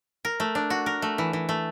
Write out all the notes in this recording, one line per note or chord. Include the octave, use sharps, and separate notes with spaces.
A#4
A3
D4
F#4
A#4
A3
E3
E3
A3